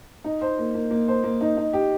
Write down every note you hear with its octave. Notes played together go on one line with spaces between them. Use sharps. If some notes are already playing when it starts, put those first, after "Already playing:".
D#4
C5
A#3
A#3
A#3
C5
A#3
D#4
D#4
G4